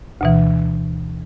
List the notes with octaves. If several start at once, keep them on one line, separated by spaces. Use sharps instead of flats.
D2 B2 E3